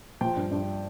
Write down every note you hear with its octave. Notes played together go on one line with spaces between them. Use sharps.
F3 G5
G2
G2